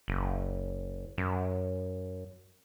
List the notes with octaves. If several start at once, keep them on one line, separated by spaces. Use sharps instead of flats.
F#1
F#2